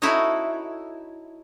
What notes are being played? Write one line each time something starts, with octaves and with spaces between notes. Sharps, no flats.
D#4 E4 F#4 A4 C#5 D#5